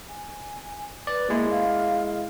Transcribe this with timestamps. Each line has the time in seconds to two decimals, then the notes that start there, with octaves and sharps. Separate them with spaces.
0.08 G#5
1.07 B4 D5
1.30 G#3 A#3 E4
1.50 F5